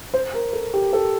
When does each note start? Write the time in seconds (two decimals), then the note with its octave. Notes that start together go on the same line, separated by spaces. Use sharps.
0.14 C5
0.34 A#4
0.53 A4
0.74 G4
0.93 A4